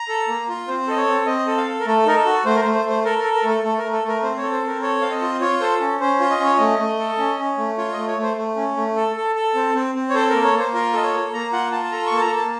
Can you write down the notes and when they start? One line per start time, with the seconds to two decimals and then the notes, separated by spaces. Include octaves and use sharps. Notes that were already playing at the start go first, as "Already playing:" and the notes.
Already playing: A#5
0.09 A4
0.28 A#3
0.49 F4
0.68 C4 C5
0.88 A4 D#5
0.97 C#5
1.07 C4
1.26 C4 D#5
1.47 A4
1.57 F5
1.66 A4
1.80 A#4
1.86 A3 A4
2.06 D#4 A#4
2.16 A4
2.25 F#4
2.45 A3 C5
2.55 A#4
2.60 A3 C5
2.74 C5
2.85 A3 C5
3.04 A4 A#4
3.19 A#4
3.24 A4
3.34 A#4
3.44 A3
3.49 A4
3.63 A3 A4
3.78 A#4
3.83 A3
3.93 A4
4.03 A3
4.08 A#4
4.23 C4 C5
4.37 C#5
4.42 A4
4.52 C5
4.62 C4 A#4
4.82 A4 C#5
5.01 C4 F5
5.11 D#5
5.21 F4
5.41 F4 C#5
5.60 A4 C5
5.80 C#4
6.00 C#4 C5
6.20 F4
6.30 D#5
6.40 C#4 C#5
6.57 A3 D#5
6.79 A3
6.99 A4
7.18 C#4
7.39 C#4
7.57 A3
7.78 F4 C#5
7.93 A3 D#5
8.07 C#5
8.18 A3 C5
8.37 A3
8.56 C#4
8.76 A3
8.96 A4
9.16 A4
9.36 A4
9.55 C4
9.74 C4
9.95 C4
10.10 C#5
10.14 A4 C5
10.29 A#3 A#4
10.44 C#5
10.54 A#3
10.59 C5
10.74 F4 A#4
10.93 A4 D#5
11.03 C#5
11.13 A#3
11.33 A#3 A#5
11.53 F4 F#5
11.72 F4 A5
11.84 A5
11.92 A4 A#5
12.07 C#6
12.12 A#3
12.17 A5
12.21 A#5
12.32 A#3 A5